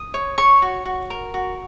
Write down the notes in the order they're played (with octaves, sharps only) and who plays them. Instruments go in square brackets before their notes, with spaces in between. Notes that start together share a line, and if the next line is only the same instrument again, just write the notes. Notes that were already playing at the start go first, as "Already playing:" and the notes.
Already playing: [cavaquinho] D#6
C#5
C#5 C#6
F#4
F#4
A#4
F#4